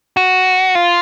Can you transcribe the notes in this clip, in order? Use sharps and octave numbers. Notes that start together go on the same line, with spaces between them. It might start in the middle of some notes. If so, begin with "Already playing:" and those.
F#4
F4